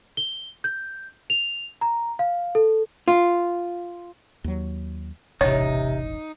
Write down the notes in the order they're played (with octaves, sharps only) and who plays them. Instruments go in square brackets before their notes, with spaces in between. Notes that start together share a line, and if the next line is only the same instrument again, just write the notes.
[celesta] G7
G6
F7
A#5
F5
A4
[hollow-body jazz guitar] F4
[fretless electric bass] D#2 F#3
[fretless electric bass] E1 A1 [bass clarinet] C3 [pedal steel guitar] D#4 [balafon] C#5